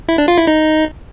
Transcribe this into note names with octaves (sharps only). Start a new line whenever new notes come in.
E4
D4
F4
E4
D#4